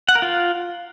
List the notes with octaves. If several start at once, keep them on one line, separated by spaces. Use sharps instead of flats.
F#5
A#4
F4